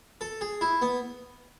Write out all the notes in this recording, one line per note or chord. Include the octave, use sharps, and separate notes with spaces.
A4
G#4
E4
B3